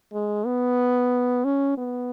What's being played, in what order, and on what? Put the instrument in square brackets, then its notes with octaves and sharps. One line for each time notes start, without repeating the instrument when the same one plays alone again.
[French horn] G#3
B3
C#4
B3